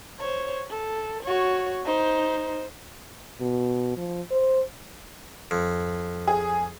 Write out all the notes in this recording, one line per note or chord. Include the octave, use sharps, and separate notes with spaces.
C5 C#5
A4
F#4 C#5
D#4 C5
B2
F3
C5
F2
G#4